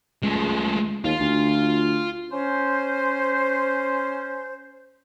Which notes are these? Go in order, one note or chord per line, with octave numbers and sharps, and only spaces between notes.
C#2 G#3 A3
D#2 F4
D2
C#4 C5